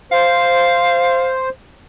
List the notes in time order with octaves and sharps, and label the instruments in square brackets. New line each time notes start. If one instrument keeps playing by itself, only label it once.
[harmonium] C5 [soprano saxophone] F5